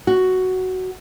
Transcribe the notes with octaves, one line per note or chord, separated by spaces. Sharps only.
F#4